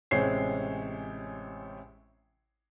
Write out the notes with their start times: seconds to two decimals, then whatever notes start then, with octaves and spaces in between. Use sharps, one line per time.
0.11 A1 C3 G#3 C5 C#5 C7